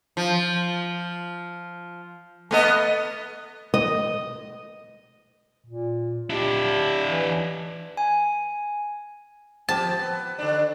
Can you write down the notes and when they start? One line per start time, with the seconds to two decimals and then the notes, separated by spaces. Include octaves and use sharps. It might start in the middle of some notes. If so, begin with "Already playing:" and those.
0.17 F3
2.51 A3 B3 D#5
3.74 D#5
5.66 A#2
6.30 D4 E4 G4
7.08 E3
7.97 G#5
9.69 F3 C4 G4 A5
9.99 B3
10.39 D3 D4